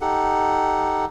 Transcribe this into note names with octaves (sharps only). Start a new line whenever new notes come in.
D#4 G4 A4 F#5